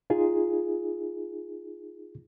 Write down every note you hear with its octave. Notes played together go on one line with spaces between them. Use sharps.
D#4 F4 G#4